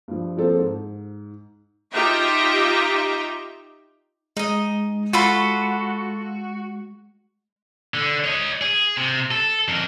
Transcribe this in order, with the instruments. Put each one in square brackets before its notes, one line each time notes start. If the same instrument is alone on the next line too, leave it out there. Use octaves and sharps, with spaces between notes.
[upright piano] G2 F3
F3 A#3 C4 F4 A4 C5
G#2
[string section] D#4 F4 G4 D#5 E5 A#5
[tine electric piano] G#3 [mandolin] D#4 D#5
[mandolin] F4 A4 B5 [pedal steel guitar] F#4
[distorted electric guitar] D3
C#5 D#5
G#4
C3
A4
F2 A#4